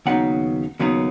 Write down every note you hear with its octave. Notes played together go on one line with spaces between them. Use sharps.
D#2 C#3 F#3 B3 D#4 F#5
D#2 C#3 F#3 B3 D#4